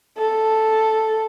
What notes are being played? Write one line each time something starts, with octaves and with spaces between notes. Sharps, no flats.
A4